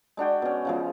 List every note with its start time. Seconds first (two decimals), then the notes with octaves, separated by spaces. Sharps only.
0.17 G#3 D4 F#4 G5
0.42 B2 C#4
0.65 C#3 F3 G#3